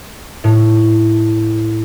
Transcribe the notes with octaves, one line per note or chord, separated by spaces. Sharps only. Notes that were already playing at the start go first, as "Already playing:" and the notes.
A2